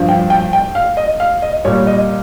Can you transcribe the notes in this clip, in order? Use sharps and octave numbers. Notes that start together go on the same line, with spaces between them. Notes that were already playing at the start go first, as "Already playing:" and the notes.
Already playing: G2 F3
G5
G5
G5
F5
D#5
F5
D#5
A#2 G3 C#5
D#5